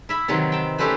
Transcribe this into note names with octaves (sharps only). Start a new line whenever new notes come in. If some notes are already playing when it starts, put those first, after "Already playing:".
E4 E5 B5
C3 D#3 E3 F#3 C4
G5 A5
A3 C#4 G4 A4 B4 C5